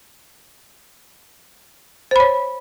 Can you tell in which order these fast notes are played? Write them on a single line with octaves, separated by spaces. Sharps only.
C5 B5 C#5